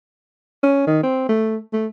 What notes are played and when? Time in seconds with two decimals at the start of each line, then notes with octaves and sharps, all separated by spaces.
0.63 C#4
0.87 D#3
1.03 C4
1.29 A3
1.73 A3